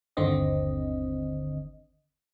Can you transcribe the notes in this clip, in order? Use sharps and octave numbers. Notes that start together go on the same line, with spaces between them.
G1 D#2 D3 C4 D#5